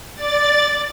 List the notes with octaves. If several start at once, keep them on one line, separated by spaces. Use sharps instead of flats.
D5 A6